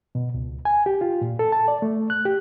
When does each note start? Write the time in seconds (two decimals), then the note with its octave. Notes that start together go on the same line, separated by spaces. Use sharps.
0.15 B2
0.34 C#2
0.65 G#5
0.86 G4
1.01 F4
1.21 A#2
1.39 A4
1.52 A5
1.68 D5
1.82 A3
2.10 F#6
2.25 G4